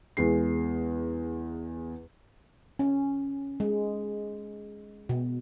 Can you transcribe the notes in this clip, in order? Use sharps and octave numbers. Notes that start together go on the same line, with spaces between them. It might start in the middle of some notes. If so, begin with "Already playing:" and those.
E2 G#3 C7
C#4
G#3
B2